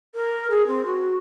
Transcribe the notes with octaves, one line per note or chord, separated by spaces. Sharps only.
A#4
G#4
C4
F#4